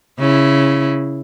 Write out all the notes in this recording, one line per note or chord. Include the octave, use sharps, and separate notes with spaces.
C#3 E4